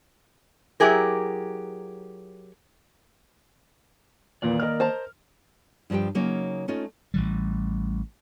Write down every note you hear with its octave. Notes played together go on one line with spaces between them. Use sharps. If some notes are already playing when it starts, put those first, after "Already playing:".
F#3 E4 G4 G#4 A#4
E2 A#2 D#3 A#3 D5
A#4 D#5 F6
C5 A5 A#5
G2 F3 D4 G4 G5
C#3 F#3 A#3 C#4 D#4 C#5
A3 C#4 D#4 F4
A1 E3 G3